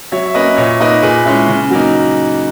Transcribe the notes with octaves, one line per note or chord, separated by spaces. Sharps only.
F#3 C#5 E5
E5
A#3 C#4 B4 D#5
A#2 C#5 E5
A#3 D#4 B4 D#5
A#2 G#4 B4
G#3 C#4 E4
C#3
F#3 A#3 D#4